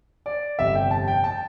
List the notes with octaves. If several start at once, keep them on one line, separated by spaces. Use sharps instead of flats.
D5
G1 F2 C3 G3 E5
G5
A5
G5
A5